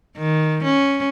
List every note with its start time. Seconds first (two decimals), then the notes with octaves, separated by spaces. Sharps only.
0.18 D#3
0.64 C#4